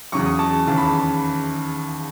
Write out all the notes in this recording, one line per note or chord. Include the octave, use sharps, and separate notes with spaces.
E2 C#3 F#3 C#6
D#6
A5 C#6
D#2 C#3 E3 A5
B5
A5
B5